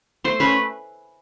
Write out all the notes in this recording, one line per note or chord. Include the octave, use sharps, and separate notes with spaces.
A3 C5
C#4 B4